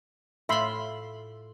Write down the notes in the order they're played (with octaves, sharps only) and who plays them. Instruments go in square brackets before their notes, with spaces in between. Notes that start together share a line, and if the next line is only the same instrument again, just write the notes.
[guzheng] A2 F4 [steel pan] E5 B5 C6